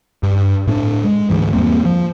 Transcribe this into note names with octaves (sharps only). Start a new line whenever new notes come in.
G2
A2 C#4 D4
G#3
D2 G#2 E3
E2 G3 A#3 C4
F3